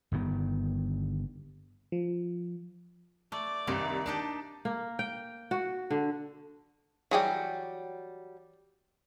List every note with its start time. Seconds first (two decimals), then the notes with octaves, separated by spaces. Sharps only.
0.12 G1 G2 D#3 B3
1.92 F3
3.32 A3 D5 D6
3.67 C2 G2 D#3 A#3 D#4
4.06 D4 D#4 G4 A5
4.65 A#3
4.99 G5
5.51 F#4
5.90 D3
7.11 E3 F#3 G3 G#4 G5